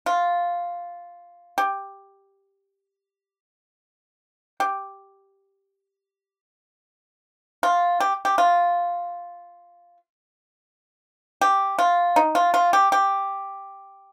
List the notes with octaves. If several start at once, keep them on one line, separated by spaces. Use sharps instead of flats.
F4
G4
G4
F4
G4
G4
F4
G4
F4
D#4
F4
F4
G4
G4